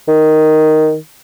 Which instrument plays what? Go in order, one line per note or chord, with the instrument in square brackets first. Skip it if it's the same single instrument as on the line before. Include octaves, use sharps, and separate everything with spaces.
[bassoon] D#3